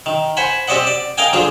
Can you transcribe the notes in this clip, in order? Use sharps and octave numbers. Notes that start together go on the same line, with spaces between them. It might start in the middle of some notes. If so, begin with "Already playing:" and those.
D#3
C5 F#5 G#5 B5
C4 G4 C5 D5 D#5 F#5
D5
A#4 D#5 F5 G5 G#5
D3 F3 D4 F4 G#4